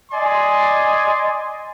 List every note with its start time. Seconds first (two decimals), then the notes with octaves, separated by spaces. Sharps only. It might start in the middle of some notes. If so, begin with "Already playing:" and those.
0.12 D5 D#5 G#5 C6